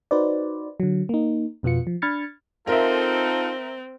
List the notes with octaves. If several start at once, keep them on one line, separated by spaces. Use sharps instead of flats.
D#4 F#4 B4 C5 D5
D3 F#3
A#3 D#4
F2 B2 B3 F4 C#7
F3
D4 B5 F6 G#6 A6 C#7
C4 D#4 F4 A4 A#4 E5